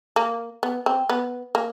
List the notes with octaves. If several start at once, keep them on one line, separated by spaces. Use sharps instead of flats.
A#3
B3
C4
B3
A#3